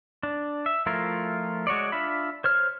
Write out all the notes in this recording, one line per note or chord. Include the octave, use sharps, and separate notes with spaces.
D4
E5
F3 A3 E4 F4 A#4
G#3 F#4 C#5 D5
D4 F4 E5 B5
C5 C#5 F6